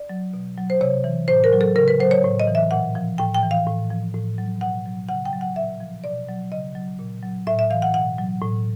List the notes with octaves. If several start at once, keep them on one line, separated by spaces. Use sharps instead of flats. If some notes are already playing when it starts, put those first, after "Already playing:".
Already playing: D5
F#3
B2
F#3
C5
C3 C#5
E3
A2 C5
A#4
F#3
A4
C#3 A#4
B4
F#3 C5
C#5
A2
D#5
E3
E5
A#2 F#5
F3
A2 G5
G5
E3
F5
A2
F3
A2
F#3
B2 F#5
F#3
C#3 F#5
G5
F#3
F#5
A#2 E5
F3
B2 D5
F#3
C#3 D#5
F#3
A#2
F#3
A2 E5
E5
E3 F5
F#5
B2 F#5
F#3
A2